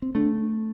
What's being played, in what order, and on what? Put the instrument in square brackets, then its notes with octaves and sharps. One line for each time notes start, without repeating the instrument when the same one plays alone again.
[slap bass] C4
[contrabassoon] D3 [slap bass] A3